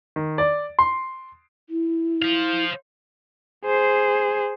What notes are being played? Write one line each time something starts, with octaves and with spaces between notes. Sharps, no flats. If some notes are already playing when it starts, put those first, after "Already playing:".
D#3
D5
C6
E4
C5 F5
G#4 C5